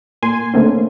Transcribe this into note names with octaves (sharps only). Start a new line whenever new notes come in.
A#2 G#5 C6
D3 A3 A#3 C4 C#4